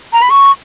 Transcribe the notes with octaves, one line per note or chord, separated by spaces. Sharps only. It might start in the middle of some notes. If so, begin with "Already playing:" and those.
A#5
B5
C#6